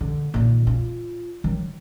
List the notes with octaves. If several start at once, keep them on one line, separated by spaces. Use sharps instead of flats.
D3
A#2 D#3
F4
D#3 F#3